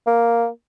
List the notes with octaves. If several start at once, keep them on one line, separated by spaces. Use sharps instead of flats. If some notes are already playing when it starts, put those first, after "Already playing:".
A#3